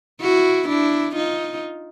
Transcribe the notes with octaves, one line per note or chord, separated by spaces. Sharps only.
E4 F#4
D4 E4
D#4 F4